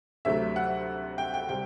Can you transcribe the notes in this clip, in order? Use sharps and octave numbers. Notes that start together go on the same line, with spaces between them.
D2 C3 F#3 A3 E5
F#5
G5
G5
C3 G3 G5